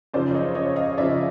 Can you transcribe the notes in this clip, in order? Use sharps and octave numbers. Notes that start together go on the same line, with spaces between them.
F#2 C#3 F3 C5 D5
C#5 D#5
C#5 D#5
D#5 F5
F#2 C#3 F3 D5 E5